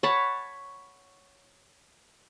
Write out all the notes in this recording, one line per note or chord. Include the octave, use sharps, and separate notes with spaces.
C#5 F#5 A5 B5